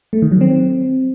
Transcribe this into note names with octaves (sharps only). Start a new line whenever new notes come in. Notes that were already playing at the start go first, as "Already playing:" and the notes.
A3
D#3
F#3
C4